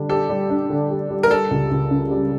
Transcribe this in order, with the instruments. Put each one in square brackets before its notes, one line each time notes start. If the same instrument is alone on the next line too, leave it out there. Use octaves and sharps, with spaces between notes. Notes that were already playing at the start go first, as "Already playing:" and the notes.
Already playing: [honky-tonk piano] D3 G3 D4
[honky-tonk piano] G4 [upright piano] A4
[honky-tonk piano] G3
D4
D3
G4
G3
[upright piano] A#4
[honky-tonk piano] G3 [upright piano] A4
[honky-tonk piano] C#2
C#2
C#3
G3